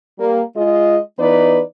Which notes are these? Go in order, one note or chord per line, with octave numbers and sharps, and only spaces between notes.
G3 A#3
G#3 F4 G#4 D#5
E3 B3 D#4 B4 D5